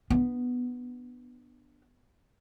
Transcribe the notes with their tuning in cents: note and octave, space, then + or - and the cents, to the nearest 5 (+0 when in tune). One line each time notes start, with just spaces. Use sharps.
B3 +0 D4 +15